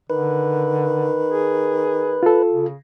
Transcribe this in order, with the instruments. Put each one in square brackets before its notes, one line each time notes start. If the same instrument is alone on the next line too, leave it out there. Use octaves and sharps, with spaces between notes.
[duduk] D3 [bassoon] D#3 [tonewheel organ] B4
[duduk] G#4
[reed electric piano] F4 A4
[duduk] C#3